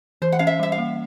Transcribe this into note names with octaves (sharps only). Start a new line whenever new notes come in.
E3 C5
F#5
C#4 F5
E5
G3 E5
F5
A#3